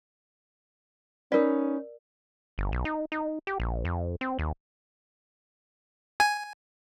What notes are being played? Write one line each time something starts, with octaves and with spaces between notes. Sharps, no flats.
C#4 D#4 A#4 B4 D5
G1
B1
D#4
D#4
G4
A#1
F2
C4
D#2
G#5